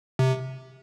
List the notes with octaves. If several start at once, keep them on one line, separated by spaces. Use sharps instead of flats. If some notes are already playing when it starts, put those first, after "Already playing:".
C3